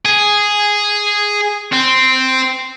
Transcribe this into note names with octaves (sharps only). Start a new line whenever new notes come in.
G#4
C4